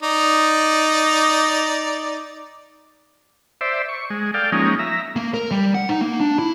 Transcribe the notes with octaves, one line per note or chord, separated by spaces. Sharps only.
D#4 D5
C5 D5 E5
C#6
G#3
A4 D5 F5 G5
F3 G#3 A#3 C#4 D#4
E5 A#5
A#3
A#4
G3
F#5
D#4
A#3
D4
E4